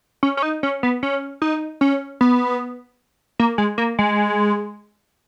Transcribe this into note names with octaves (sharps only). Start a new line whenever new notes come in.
C#4
C#4
D#4
C#4
B3
C#4
D#4
C#4
B3
A#3
G#3
A#3
G#3